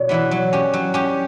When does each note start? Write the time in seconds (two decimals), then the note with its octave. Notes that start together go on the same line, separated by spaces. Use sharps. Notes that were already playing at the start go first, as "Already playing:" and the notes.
Already playing: B2 C#5 D5
0.09 E3 B3 E4 B4
0.31 F#3
0.53 C#4 G4
0.73 F#3
0.94 C#4 G4